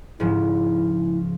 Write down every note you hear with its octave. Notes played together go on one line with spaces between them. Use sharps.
G#2 C#3 F3 E4